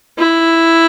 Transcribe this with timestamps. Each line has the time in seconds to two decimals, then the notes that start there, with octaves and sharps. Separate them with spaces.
0.18 E4